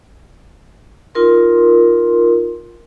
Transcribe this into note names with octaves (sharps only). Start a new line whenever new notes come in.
D#4 F4 A#4 C6